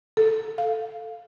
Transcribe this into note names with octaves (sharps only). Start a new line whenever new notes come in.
A4
F5